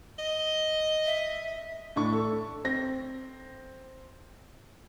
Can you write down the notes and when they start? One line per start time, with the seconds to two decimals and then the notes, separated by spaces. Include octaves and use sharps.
0.18 D#5
1.06 E5
1.96 A2 D4 C#6
2.13 A4
2.65 C4 A#6